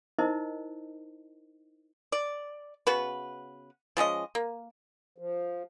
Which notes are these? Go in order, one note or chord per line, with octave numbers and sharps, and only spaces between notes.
D#4 E4 A#4 C5 D#5
D5
C#3 B3 F#4 B4
F3 G#3 C#4 D#5
A#3
F3